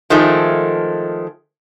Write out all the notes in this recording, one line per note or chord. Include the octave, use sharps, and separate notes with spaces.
D#3 F3 G#3 A3